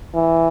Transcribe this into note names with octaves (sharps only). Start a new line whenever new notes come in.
E3